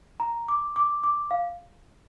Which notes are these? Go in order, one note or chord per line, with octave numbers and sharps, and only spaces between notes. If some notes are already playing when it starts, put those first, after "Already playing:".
A#5
D6
D6
D6
F5